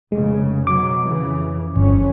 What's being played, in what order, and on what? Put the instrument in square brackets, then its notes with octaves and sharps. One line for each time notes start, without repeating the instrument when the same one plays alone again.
[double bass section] F1 C#3 [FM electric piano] G#3
[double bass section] B2 F#3 [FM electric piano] D6
[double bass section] F2 C#3 E3
[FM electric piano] G1 [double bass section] F2 C#4